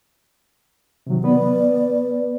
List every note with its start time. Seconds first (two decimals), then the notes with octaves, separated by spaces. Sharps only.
1.07 C3 D#3 F#3
1.24 B3 B4 D5